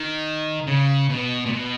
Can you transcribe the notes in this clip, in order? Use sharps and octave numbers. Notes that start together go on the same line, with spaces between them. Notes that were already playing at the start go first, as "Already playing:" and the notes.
Already playing: D#3
C#3
B2
A#2
B2